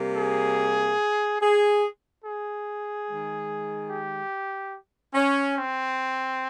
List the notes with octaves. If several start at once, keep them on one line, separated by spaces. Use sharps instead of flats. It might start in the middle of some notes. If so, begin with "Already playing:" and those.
Already playing: C3 G3 A#3
G#4
G#4
G#4
D#3 G#3
G4
C#4
C4